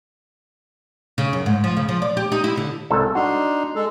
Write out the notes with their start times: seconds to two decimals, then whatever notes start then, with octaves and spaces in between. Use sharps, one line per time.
1.18 C#3
1.33 F#2
1.46 G#2
1.64 F3
1.77 C#3
1.89 F3
2.02 D5
2.17 G4
2.32 D#4
2.44 E4
2.57 D3
2.90 C2 G#2 A4
3.15 D4 D#4 F#4 C6
3.76 G#3 A4